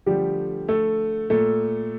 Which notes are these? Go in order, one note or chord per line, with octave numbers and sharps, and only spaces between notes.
D3 F3 G3 A3 G4
A3 A4
A#2 A3 A4